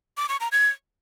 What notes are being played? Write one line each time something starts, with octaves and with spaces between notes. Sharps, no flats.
D6
C#6
A#5
G#6